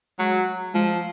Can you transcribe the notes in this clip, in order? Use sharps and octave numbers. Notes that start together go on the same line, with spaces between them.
F#3 G#3
F3 G#3